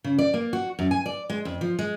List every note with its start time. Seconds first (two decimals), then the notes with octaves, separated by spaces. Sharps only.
0.04 C#3
0.18 D5
0.34 A#3
0.53 F#4
0.79 F#2
0.91 G#5
1.06 D5
1.30 G#3
1.45 F2
1.61 F3
1.79 G#3